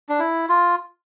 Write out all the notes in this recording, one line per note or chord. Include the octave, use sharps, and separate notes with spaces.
D4
E4
F4